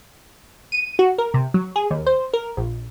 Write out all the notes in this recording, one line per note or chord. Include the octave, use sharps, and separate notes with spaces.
D#7
F#4
A#4
C3
F#3
G#4
D#2
C5
A#4
A#1